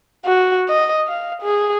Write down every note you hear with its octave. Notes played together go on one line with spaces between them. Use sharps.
F#4
D#5
F5
G#4